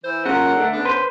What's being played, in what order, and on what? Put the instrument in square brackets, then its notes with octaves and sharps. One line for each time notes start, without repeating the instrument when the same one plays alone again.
[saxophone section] E3 E4 C5
[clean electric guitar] F#2 A#2 C#3 [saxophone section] C#4 A#4 F#5
[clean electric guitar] D3 A3
[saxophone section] C#3 B3 D4
[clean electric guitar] B4 C5